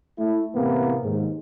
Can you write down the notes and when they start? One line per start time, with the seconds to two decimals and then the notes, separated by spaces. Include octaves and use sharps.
0.18 A3 E4
0.55 A2 C3 E3 A#3 B3
1.04 D#2 G#2